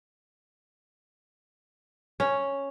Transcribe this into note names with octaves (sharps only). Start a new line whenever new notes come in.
C#4